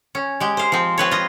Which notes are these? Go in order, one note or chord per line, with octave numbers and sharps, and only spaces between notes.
C#4
G#3 G4
C5 F5
F3 C4
C4 B4 C#5
F4 D#5